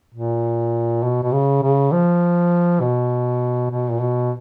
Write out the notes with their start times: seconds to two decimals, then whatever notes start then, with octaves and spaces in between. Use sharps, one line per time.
0.14 A#2
1.03 B2
1.23 B2
1.33 C#3
1.63 C#3
1.92 F3
2.80 B2
3.70 B2
3.91 A#2
4.00 B2